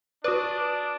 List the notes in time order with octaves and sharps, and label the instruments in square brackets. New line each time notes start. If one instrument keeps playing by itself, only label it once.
[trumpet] D4 [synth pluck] F#4 B4 [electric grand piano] D5 D6 D#6